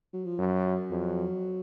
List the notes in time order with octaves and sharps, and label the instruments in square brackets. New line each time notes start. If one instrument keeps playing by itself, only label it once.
[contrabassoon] F#3
F3
[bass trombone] F#2 [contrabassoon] F#3
[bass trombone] F2